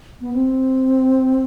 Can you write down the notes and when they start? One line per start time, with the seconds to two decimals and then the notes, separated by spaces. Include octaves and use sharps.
0.21 B3
0.33 C4